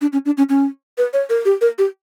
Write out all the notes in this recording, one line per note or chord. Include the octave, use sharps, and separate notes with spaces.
D4
C#4
D4
C#4
C#4
B4
C#5
A#4
G4
A#4
G4